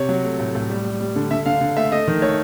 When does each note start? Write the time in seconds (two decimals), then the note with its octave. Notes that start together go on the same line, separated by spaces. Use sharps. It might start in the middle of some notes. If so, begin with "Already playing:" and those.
Already playing: C3 C#5
0.09 F#3
0.25 A3
0.39 A2
0.55 A2
0.70 G3
0.85 G3
1.00 G3
1.16 D3
1.31 D3 E5
1.46 D3 F5
1.61 D3
1.77 A3 E5
1.92 A3 D#5
2.08 D#3
2.22 A3 C#5